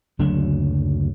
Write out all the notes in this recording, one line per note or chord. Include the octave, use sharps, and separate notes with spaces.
F#1 D2 F#3 D4